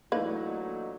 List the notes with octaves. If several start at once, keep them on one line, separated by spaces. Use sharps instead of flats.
D2 A#2 E3 F#3 A3 A#3 D#4 B4